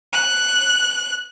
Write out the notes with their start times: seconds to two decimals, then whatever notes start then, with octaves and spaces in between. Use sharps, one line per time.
0.12 F#6